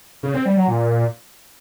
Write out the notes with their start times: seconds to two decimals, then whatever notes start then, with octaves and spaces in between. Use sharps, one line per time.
0.23 C#3
0.34 C4
0.46 G3
0.57 F#3
0.68 A#2